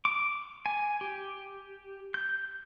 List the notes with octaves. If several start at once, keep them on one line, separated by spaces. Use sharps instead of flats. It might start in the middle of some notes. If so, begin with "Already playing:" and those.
D6
G#5
G4
G6